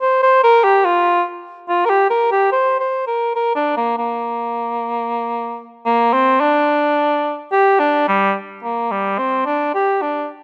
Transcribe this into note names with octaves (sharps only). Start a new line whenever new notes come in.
C5
C5
A#4
G4
F4
F4
A#4
G4
A#4
G4
C5
C5
A#4
A#4
D4
A#3
A#3
A#3
C4
D4
G4
D4
G3
A#3
G3
C4
D4
G4
D4